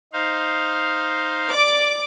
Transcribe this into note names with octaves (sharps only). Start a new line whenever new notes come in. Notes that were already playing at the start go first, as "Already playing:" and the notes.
D#4 C5 F5
D5 D6